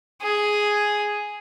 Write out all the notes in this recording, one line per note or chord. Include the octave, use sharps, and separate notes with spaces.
G#4